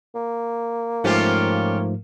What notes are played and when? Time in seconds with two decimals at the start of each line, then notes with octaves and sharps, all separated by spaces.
0.15 A#3
1.04 G#2 F3 A3 C#4 F4 G4